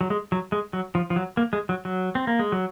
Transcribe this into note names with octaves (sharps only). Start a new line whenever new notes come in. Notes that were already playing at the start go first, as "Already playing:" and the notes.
F#3
G#3
F#3
G#3
F#3
F3
F3
F#3
A#3
G#3
F#3
F#3
C4
A#3
G#3
F#3